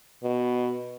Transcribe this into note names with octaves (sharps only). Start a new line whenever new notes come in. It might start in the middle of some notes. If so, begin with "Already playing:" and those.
B2